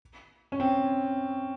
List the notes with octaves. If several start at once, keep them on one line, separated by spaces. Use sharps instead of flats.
C#4
C4